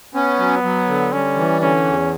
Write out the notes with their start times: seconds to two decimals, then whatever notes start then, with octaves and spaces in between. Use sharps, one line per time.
0.15 B3 C#4
0.39 F#3
0.63 F#3
0.88 D3
1.12 G3 C#4
1.37 E3
1.61 D3 C#4
1.85 E2